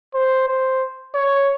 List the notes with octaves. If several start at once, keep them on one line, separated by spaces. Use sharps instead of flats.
C5
C5
C#5